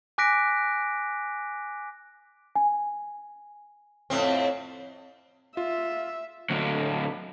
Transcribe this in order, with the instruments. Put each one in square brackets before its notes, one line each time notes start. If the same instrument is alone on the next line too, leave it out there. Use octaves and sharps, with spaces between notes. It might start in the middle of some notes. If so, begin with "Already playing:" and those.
[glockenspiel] G#5 D6 F#6 A#6 B6 D7
[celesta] G#5
[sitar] F2 A2 C4
[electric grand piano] F4 [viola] E5
[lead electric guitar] D2 F#3